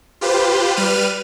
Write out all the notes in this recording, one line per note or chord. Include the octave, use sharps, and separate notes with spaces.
F4 G4 B4 C5
G3 B4 F6 D#7